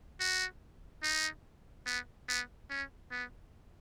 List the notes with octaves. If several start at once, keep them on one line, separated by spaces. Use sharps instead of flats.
F#4
D#4
B3
B3
C#4
B3